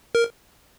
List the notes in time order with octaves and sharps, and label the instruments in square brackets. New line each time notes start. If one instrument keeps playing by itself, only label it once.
[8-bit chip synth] A#4